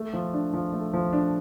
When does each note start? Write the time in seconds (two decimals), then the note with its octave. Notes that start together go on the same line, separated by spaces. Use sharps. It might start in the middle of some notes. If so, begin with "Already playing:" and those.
Already playing: A3
0.13 F3
0.33 D4
0.53 F3
0.73 A3
0.94 F3
1.13 D4